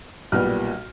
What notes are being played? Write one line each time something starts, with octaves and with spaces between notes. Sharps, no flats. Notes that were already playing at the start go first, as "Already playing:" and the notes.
B1 A#2 G3 B3 F6